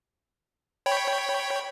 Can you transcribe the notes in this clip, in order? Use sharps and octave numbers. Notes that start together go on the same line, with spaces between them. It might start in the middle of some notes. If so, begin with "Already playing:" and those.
C#5 G5 B5